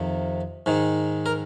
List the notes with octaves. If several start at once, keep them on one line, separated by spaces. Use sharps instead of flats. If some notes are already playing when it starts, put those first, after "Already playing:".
Already playing: F2 C3 D#3
G#2 D#3
A#4